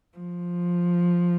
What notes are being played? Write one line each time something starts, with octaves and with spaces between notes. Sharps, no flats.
F3